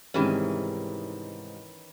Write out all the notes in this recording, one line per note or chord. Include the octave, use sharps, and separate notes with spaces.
G#2 C3 D#3 E3 G3 C#4